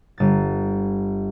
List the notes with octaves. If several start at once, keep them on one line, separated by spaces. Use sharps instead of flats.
G1 A6